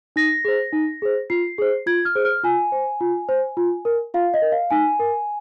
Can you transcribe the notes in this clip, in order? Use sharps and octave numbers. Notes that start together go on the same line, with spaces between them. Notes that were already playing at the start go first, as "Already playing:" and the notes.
D#4 A#6
G#4 C5
D#4
G#4 C5
F4 C7
G#4 C5
F4 G#6
F6
G#4 C5
F6
F4 G#5
C5
F4
C5
F4
A#4
F4 F5
D#5
A#4
F5
D#4 G#5
A#4